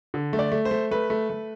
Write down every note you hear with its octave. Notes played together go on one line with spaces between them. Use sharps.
D3
A3
D5
A3
C5
A3
A3 B4
A3
A3